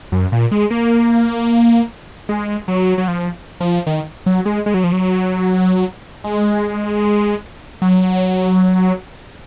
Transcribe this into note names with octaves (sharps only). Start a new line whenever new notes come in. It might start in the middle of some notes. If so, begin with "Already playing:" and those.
F#2
A#2
G#3
A#3
G#3
F#3
F#3
F3
F3
D#3
F#3
G#3
G#3
F#3
F3
F#3
G#3
F#3